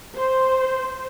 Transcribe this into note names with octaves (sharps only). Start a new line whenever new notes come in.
C5